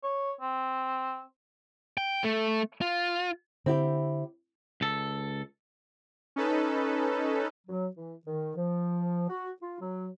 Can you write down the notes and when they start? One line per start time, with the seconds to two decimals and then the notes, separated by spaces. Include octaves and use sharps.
0.03 C#5
0.41 C4
1.97 G5
2.24 A3
2.81 F4
3.66 D3 C4 E4 G4
4.81 C#2 A4
6.36 C#4 D#4 A4 B4
7.67 F#3
7.96 E3
8.26 D#3
8.56 F3
9.29 F#4
9.61 F4
9.80 F#3